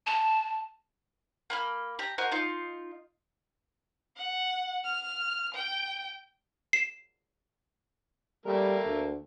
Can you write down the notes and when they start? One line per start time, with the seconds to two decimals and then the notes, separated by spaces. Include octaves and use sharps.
0.07 A5
1.50 A#3 B5 F6
1.99 G4 A#5
2.18 F#4 A#4 C5 D#5
2.31 D#4 F4
4.17 F#5
4.84 F6
5.54 G5
6.73 C7 E7
8.46 G3 A3 A#3 A#4
8.85 D2